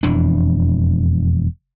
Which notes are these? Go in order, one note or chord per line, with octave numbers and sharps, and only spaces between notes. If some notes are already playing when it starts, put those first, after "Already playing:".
E1 F2 E3 D4